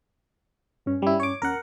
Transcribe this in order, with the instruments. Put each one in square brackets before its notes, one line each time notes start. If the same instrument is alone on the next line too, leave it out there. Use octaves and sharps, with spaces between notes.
[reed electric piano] G2 C#4
[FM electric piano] G3 E4
C#5 D6
[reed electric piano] D#2 C#4 [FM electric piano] A#4 F#5